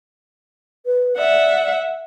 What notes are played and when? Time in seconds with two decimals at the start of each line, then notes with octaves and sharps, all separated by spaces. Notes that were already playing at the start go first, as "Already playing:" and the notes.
0.86 B4
1.17 D5 E5 F#5